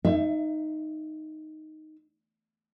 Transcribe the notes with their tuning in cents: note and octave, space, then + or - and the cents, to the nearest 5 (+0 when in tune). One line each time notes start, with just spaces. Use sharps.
D#4 +0 E5 +30